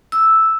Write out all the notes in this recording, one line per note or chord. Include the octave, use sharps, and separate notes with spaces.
E6